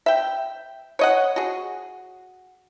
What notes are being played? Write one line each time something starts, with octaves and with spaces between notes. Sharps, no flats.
E5 G5
C#5 D#5 F#5
F#4 G#4